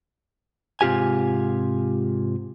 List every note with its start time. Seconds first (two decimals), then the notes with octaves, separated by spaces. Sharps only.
0.81 G#2 C3 F4 G4 G#5